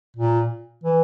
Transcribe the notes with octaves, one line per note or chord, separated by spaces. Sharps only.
A#2
E3